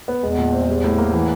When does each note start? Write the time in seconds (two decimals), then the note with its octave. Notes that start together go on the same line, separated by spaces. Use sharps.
0.08 B3
0.23 E2 G#3
0.38 A#2
0.53 C4
0.69 G3
0.84 A2
0.98 A#3
1.13 E3